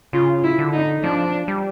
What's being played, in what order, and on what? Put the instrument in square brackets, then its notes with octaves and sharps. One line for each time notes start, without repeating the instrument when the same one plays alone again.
[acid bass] C#3 [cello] F4
[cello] E4
[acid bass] D3
[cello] D#4
[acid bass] F3 [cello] D4
[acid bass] G3